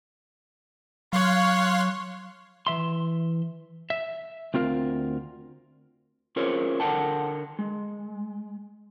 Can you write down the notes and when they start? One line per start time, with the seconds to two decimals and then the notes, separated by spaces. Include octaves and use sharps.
1.13 F#3 C#5 F5 C6 F#6
2.67 E3 E5 C6
3.90 E5
4.54 D2 C4 F4 A#4 F5
6.36 C#4 F4 G#4 A#4 C5 C#5
6.80 D3 A#4 C#5 F#5 G5 A5
7.59 G#3